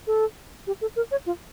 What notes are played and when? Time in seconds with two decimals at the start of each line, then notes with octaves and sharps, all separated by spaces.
0.07 A4
0.67 G4
0.81 A4
0.96 A#4
1.11 C#5
1.26 F4